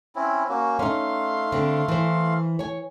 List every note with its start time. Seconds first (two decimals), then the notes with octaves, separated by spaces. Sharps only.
0.16 C4 C#4 E4
0.49 A#3 C#4 F#4
0.79 A3 C#4 D#4 F5 C6
1.52 D3 C4
1.88 E3 C5
2.59 C#5 G#5